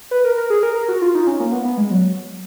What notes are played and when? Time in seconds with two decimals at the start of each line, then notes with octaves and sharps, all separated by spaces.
0.11 B4
0.24 A#4
0.38 A#4
0.50 G#4
0.63 A#4
0.75 A#4
0.88 F#4
1.02 F4
1.15 D#4
1.27 C#4
1.40 A#3
1.52 B3
1.65 B3
1.78 G#3
1.91 F#3